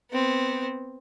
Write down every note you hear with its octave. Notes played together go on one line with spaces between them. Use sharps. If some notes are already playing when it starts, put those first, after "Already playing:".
B3 C4